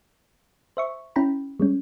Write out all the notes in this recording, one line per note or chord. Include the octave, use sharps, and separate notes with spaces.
C5 E5 C#6
C#4 E4 G5 A#5 B5
G3 G#3 C#4